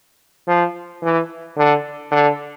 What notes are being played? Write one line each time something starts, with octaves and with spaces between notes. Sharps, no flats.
F3
E3
D3
D3